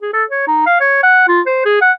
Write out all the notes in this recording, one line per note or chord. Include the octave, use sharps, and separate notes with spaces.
G#4
A4
C#5
D#4
F5
C#5
F#5
F4
C5
G#4
F#5